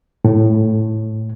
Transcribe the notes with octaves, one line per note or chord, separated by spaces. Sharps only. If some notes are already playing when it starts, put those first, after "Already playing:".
A2